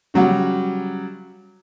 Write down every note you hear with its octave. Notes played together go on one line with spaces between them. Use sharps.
C#3 F#3 G3 F#4